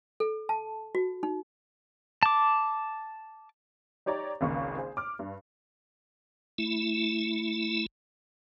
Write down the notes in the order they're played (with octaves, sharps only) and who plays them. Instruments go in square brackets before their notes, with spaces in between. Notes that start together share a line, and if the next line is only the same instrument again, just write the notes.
[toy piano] A4
A5
F#4
D#4
[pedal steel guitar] A5 D6
[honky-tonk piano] D#4 G4 C#5 D5 A#5
G#1 C#2 C#3 A#3 C#6
G#4 C5
D6 F6
G2
[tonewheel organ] A3 E4